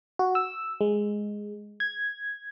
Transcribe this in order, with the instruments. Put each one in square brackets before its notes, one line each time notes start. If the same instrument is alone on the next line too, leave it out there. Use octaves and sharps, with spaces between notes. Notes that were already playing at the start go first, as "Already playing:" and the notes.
[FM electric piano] F#4
E6
G#3
G#6